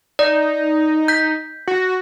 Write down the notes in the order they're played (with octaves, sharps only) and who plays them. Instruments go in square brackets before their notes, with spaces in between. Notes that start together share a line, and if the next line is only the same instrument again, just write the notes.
[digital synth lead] D#4 [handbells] D5
[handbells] G6 B6
[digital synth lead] F#4